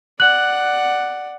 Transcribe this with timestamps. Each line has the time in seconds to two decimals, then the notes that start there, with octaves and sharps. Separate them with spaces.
0.20 D5 F#5 F#6 F#7